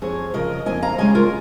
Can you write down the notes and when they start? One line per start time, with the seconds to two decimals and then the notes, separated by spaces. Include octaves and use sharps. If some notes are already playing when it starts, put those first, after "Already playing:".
0.02 F2 G#4 C#5
0.34 C#3 F3 A#4 D#5
0.66 F2 D#5 G#5
0.82 F5 A#5
0.98 C#3 G#3 C#4 D#5 G#5
1.15 F4 A#4